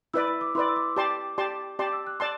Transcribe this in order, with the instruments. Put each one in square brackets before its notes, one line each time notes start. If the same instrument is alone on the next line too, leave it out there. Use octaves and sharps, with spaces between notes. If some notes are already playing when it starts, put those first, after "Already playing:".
[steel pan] E4 B4 D5 [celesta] E6
[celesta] E6
D6
[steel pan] E4 B4 D5 [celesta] C6
[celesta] E6
D6
[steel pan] G4 D5 A5 C6 [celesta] D6
[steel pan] G4 D5 A5 C6
[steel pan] G4 D5 A5 C6 [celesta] D6
[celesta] E6
F#6
[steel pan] D5 A5 C6 [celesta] F#6